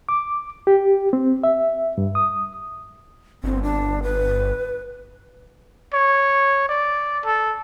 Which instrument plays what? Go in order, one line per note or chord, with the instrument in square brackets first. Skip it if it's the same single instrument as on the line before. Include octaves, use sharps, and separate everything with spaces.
[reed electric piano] D6
G4
C4
E5
G2
D#6
[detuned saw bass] G1 [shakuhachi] C4
[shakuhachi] D4
B4
[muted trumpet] C#5
D5
A4